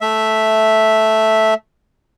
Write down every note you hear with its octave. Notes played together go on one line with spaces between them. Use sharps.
A3 E5